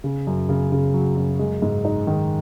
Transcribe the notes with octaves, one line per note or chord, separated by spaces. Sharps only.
C#3
F#2
C#3
C#3
F#3
F#2
G#3
G#2
D#4
D#3